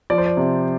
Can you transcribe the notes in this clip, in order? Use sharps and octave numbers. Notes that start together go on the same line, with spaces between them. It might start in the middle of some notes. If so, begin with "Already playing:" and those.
F3 D5
C5
D5
C3